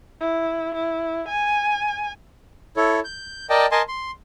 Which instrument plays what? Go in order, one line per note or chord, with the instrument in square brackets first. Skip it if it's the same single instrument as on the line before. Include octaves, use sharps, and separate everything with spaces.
[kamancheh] E4
E4
G#5
[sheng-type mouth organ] E4 A4 C#5
G6
A#4 D5 D#5 G5 A5
A#4 D#5 G#5 A5 C6
C6